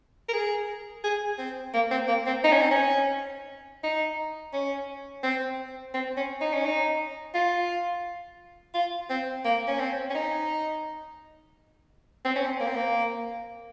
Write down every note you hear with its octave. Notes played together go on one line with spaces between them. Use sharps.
A#4
G#4
G#4
C4
A#3
C4
A#3
C4
D#4
C#4
C4
C#4
D#4
C#4
C4
C4
C#4
D#4
C#4
D#4
F4
F4
C4
A#3
C#4
C4
C#4
D#4
C4
C#4
C4
A#3
C4
A#3